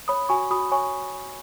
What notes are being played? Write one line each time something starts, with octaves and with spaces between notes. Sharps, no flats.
C#5 B5 D#6
F#4 G#5 C#6
F#4 B5 D#6
C#5 G#5 C#6